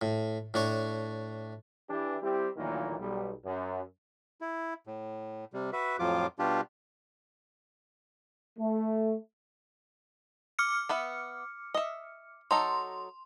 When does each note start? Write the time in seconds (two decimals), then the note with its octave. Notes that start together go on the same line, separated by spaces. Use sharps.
0.01 A2
0.54 A2 D4 C#5
1.90 E3 D4 G4
2.23 G3 C4 E4 G4
2.57 D2 A#2 D#3 E3 F#3 A#3
2.98 B1 G3
3.45 F#2
4.41 E4
4.87 A2
5.53 C3 G3
5.73 F#4 B4 E5
5.99 F2 A2 F3 F#3 F4 D6
6.39 B2 G3 D4 F4 G4
8.59 A3
10.59 D6 F6 C#7
10.89 B3 B4 E5
11.74 D#5 E5
12.51 F#3 D#4 A4 C6